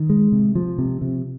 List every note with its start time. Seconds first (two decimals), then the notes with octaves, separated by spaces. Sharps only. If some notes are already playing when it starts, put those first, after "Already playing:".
Already playing: D#3
0.09 G#3
0.32 C3
0.55 F3
0.78 C3
1.02 C3